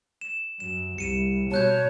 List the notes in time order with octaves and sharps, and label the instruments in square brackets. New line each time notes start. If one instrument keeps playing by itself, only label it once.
[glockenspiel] E7
[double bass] F#2 [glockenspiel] E7
[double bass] C2 [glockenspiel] C#7 D#7 E7
[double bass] B2 [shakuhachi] C#5 [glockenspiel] A5 F#6 G6